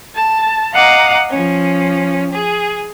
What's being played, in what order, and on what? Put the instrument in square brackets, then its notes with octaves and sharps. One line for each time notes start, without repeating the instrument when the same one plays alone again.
[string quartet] A5
D#5 F5 F#5 A#5 D6 D#6
F3 C#4
G#4